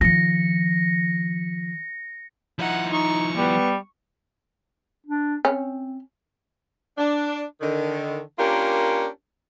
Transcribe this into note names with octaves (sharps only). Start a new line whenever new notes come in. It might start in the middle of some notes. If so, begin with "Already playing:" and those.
D#3 F3 A#6 C#7
F3 D#4 E4 F#5
D#4 C#6
G3 B3
D4
C4 C#4
D4
D3 D#3
A#3 C#4 D4 F4 G4 A#4